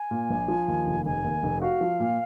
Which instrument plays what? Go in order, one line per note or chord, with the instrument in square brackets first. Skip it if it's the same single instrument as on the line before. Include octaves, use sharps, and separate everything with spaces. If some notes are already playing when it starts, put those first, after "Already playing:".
Already playing: [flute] G#5
[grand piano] A#2
A#1
F3
D#2
F1
[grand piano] F1 [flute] G#5
[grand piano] D#2
F1
[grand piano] F#4 [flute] F5
[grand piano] F3
A#2